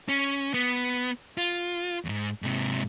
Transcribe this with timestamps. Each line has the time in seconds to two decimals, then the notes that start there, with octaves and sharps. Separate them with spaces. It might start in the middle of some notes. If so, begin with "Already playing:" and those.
0.09 C#4
0.54 B3
1.38 F4
2.05 E2 G#2
2.43 G#2 C3